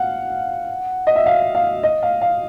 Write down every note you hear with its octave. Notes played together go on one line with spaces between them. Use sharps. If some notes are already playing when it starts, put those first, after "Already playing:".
Already playing: F5 F#5
D#5
E5
F5
F5
D#5
F5
F5